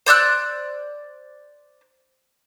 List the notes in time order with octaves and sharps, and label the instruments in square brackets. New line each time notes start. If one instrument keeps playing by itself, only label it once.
[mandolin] C5 D5 E6 F#6